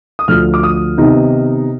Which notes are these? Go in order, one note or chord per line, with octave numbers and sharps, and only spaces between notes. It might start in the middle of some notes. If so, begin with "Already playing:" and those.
D#6
D2 D3 F3 F6
D6
D#6
C3 D#3 B3 D#4